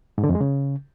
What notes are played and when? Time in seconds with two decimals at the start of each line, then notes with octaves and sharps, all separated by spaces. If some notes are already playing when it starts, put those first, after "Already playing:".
0.18 G#2
0.24 D3
0.29 F2
0.35 G#3
0.41 C#3